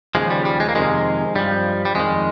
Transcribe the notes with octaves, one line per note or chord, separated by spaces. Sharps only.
D#2 C#3 F3 G#3
G3
G3
G#3
A#3
F2 C3 D#3 G#3
G2 F3 G3
G3
F2 D#3 G#3